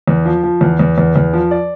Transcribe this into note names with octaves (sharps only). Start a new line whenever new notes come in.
E2
F3
F3
E2
E2
E2
E2
F3
D5